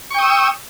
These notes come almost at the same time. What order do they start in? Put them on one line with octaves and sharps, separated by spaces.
C#6 G5 D#6 E6